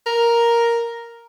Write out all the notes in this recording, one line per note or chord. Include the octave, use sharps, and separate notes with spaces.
A#4